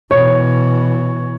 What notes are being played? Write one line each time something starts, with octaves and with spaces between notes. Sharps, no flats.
B2 E3 C#5